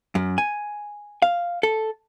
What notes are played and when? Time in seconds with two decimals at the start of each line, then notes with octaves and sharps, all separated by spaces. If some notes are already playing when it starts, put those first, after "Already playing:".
0.15 F#2
0.38 G#5
1.22 F5
1.63 A4